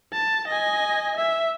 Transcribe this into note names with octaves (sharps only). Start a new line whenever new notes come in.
A5
D#5 G#5
E5